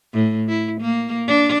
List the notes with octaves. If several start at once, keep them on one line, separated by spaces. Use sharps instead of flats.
A2
E4
A#3
D4